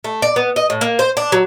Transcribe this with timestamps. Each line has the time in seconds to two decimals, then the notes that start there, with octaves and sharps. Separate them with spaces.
0.04 A3
0.22 D5
0.36 B3
0.56 D#5
0.70 A2
0.81 A#3
0.99 C5
1.17 D4
1.32 F#3